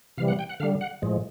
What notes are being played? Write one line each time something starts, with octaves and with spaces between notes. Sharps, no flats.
C3 E3 G3 F5
F#5
G5
F#5
D3 G3 F5
F#5
A2 F3 G#3